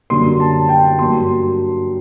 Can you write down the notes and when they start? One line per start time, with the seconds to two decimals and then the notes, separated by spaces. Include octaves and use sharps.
0.10 F#2 D3 G3 A#3 C6
0.40 A5
0.69 G5
0.99 G2 F#3 A#3 C6